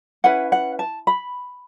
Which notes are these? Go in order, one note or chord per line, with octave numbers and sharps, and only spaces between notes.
C#4 E4 B4 F#5
F#5
A5
B5